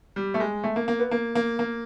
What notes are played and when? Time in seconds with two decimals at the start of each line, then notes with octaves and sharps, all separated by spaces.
0.16 G3
0.34 A3
0.40 G#3
0.64 A3
0.76 A#3
0.88 A#3
0.99 B3
1.11 A#3
1.35 A#3
1.59 A#3